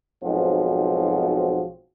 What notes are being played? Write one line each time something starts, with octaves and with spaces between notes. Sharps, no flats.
B1 G#2 F3 C4 F#4